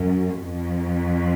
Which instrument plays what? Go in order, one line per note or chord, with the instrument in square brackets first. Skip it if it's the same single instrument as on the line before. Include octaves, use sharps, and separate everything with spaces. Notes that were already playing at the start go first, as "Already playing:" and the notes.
Already playing: [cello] F#2
F2